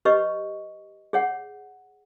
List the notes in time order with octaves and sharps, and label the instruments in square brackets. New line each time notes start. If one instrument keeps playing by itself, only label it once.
[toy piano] G4 B4 C#5 D#5 C#6
G#4 C#5 F#5